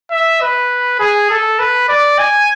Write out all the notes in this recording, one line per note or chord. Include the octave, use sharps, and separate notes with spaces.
E5
B4
G#4
A4
B4
D5
G#5